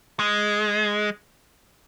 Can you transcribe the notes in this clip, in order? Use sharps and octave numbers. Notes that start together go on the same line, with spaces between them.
G#3